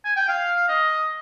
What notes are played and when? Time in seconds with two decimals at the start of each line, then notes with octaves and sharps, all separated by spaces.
0.05 G#5
0.17 G5
0.28 F5
0.69 D#5